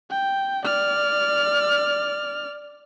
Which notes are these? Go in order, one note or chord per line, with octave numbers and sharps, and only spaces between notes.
G5
D5 F6